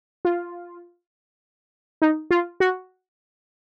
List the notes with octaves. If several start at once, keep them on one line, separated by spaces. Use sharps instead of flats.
F4
D#4
F4
F#4